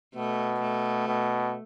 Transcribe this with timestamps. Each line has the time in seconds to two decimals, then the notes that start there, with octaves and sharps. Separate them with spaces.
0.15 B2 A3
0.61 A3
1.08 B2